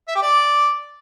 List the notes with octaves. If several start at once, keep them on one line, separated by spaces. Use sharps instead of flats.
E5
G4
D5